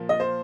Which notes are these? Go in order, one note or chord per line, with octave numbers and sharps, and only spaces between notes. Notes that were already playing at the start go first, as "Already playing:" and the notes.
Already playing: A#2 F3 A#3
D#5
C5